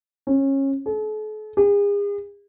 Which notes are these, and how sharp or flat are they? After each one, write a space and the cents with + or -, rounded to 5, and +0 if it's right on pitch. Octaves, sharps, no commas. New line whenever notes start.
C#4 -25
A4 -45
G#4 -40